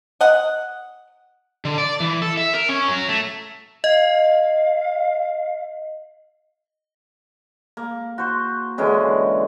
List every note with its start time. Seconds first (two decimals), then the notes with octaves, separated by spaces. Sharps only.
0.21 D#5 F#5
1.65 D3
1.78 D5
2.00 E3
2.22 A4
2.37 E5
2.53 A#4
2.69 C#4
2.88 F#3
3.09 A3
3.84 D#5 F5
7.77 A#3
8.18 F#4 C5
8.78 D3 E3 G#3 C#4